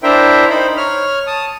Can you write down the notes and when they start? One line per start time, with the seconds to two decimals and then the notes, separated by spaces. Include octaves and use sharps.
0.03 D4 E4 A#4 C5 E5 G5
0.50 D#4 C5 B5
0.77 C#5 F6
1.27 A5 D#6